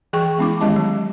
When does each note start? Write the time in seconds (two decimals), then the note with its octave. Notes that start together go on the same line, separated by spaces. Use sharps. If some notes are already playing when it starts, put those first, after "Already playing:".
0.13 E3 G#4 G5 C#6
0.38 G#3 B3 C#4 E4 D6
0.61 D#3 G#3 G4 D#5 A5
0.76 F#3